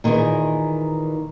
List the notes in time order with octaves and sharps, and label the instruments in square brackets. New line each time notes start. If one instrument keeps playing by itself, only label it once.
[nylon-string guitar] A#2 D#3 E3 G#4 A#4